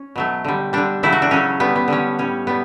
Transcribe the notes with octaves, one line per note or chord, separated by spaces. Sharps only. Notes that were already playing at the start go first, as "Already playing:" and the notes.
Already playing: C#4
B2 F#3 A3
D3 G3
D3 G3 D4
C#3 F#3 A3 E4
F#4
D4
C#3 F#3 A3 C#4
D3 G3 B3
B3
D3 G3 C#4
A2 G3 C#4
A2 G3 B3